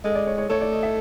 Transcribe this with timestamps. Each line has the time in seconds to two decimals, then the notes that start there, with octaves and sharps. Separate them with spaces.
0.04 G#3 A4
0.10 D#5
0.15 D5
0.27 C#5
0.38 C#5
0.49 A3 C#5
0.61 D5
0.72 D#5
0.83 E5